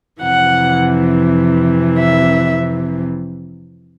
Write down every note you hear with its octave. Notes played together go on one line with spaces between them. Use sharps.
F2 C3 E3 F#5
E5